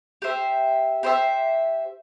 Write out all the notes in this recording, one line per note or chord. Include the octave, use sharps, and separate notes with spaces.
G4 C5 E5
G4 C5 E5